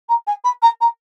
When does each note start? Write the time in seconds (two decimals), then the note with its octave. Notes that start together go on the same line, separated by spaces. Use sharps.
0.09 A#5
0.27 G#5
0.44 B5
0.62 A#5
0.81 A#5